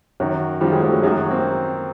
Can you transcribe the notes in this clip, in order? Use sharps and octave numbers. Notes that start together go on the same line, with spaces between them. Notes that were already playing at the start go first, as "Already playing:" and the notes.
F#2 D#3 F#3
F#2 D#3 F3 G3
F#3 G#3
G3 A3
F#3 G#3
F#2 D#3 F#3 G#3
F#3
A#3 C4